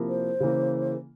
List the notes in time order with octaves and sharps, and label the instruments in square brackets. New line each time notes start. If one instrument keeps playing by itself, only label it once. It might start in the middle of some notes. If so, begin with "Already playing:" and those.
Already playing: [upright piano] C3 F3 A#3 E4 A#4
[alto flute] C5
[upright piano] C#3 E3 A#3